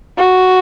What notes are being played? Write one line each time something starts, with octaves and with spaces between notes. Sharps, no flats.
F#4